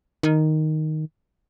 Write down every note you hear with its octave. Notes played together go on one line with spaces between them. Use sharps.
D#3